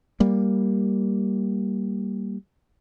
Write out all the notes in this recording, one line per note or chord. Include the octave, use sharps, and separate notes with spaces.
G3 A#3